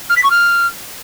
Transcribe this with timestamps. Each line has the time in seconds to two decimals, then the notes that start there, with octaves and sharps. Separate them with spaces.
0.09 F6
0.16 B6
0.23 C#6
0.30 F6